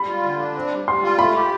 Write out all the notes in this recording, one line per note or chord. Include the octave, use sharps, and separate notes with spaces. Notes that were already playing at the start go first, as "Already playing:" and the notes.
Already playing: G3 B5
F4
D3
D4
C4
G3
G3 C6
F4
A3 B5
G4